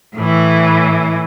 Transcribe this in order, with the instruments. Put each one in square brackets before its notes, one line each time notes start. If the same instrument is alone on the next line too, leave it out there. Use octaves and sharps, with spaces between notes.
[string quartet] A2
E3